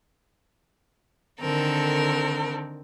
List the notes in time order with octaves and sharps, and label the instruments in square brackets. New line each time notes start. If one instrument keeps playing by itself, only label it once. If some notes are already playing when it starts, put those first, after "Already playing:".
[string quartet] D3 D#3 C4 A4 A#4